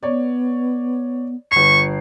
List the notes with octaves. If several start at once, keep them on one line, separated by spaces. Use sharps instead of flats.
B3 C#5 D5
G1 C#6 C7